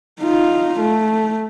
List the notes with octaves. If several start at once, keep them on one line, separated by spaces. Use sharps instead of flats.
D#4 F4
A3